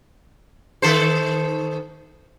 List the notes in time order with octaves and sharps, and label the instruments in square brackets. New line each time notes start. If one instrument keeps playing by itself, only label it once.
[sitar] D#3 A4 C5